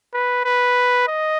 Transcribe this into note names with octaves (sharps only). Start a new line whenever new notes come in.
B4
B4
D#5